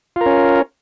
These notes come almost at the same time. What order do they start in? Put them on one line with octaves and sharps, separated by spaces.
F4 A#4 C#4